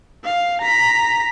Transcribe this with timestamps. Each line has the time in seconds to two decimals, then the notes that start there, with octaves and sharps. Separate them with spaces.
0.24 F5
0.62 A#5 B6